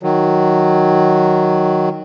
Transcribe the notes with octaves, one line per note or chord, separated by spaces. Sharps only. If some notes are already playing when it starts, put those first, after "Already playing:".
D#3 F#3